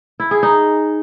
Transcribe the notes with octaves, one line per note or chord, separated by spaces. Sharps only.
E4
G#4
D#4